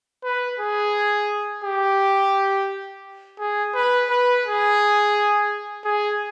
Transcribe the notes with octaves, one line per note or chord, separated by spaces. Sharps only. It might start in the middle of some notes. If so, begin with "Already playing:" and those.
B4
G#4
G4
G#4
B4
B4
G#4
G#4